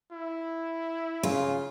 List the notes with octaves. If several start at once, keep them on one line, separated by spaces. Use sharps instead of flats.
E4
C#3 F4